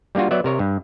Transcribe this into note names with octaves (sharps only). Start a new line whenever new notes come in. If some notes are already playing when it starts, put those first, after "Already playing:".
G3 A#3 D4 F4 F#4
F#3 B3 D5 E5
C3 A#4 C#5
G2